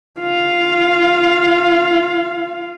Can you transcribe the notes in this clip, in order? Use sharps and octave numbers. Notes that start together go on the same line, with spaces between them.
F4 F5